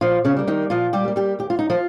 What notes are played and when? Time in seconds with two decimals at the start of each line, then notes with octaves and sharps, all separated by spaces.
0.01 A#2 F3 F4
0.25 C#3 C#4
0.37 G3 A#3
0.47 D#3 D#4
0.70 A#2 F3 F4
0.93 G3 G4
1.05 G3 A#3
1.16 G3 G4
1.39 D#2 G4
1.50 F4
1.59 D#4
1.70 F3 F4